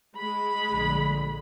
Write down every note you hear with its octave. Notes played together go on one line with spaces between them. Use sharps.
G#3 B5
A#1 D3